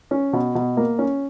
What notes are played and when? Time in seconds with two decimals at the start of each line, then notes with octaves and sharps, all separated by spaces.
0.11 C#4
0.33 B2
0.55 B2
0.77 A#3
0.99 C#4